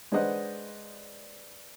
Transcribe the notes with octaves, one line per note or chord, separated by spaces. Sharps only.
G#3 D4 B4 C5 D#5 F#5